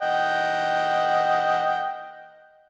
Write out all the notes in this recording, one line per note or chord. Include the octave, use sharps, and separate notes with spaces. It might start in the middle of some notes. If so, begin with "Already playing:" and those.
D#5 F#5 G5